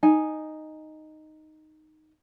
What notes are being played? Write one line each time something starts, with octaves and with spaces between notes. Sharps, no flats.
D#4 G#5